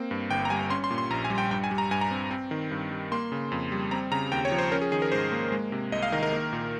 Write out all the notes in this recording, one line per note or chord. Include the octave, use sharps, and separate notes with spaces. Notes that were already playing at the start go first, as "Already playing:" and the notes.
Already playing: A#3 C4
G2
G1 G5
A#5
G3 G#5
C#4 C6
C6
A#2
C6
A#1 A#5
G#5
G3
G5
G2 G5
G#5
G3
A#5
G2 G#5
A#5
C4
C4
D#3
G2
G3
A#3 C6
C#3
F2
G3
C4 A#5
C#3 A#5
D#2 G5
C#5
F3
C5
C#4 A#4
G#4
D#3 G#4
A#4
G#2 C5
A#3
G#3
C3
C2 D#5
F5
D#3 A#4
A#4
A#3
A#2